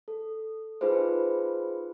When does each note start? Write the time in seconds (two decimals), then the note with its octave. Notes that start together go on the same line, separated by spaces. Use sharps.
0.08 A4
0.81 D#4 F4 G#4 B4 C5